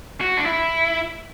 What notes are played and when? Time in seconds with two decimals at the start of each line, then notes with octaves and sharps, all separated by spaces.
0.21 F#4
0.37 D4
0.46 E4